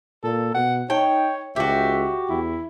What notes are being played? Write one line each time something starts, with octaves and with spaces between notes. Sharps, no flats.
A#2 A4
B2 F#5
D#4 C#5 G5
C#2 F#4 G4 E5
E2 E4